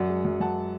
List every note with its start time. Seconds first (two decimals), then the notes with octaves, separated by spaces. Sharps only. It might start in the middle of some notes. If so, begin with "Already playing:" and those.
Already playing: F#2 F#3 D5 F#5
0.09 G#3
0.25 F#2
0.40 F#2 F#5 A5